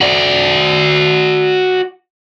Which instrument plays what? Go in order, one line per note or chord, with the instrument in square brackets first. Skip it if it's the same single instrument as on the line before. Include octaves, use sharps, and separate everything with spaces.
[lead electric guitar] F#4 D5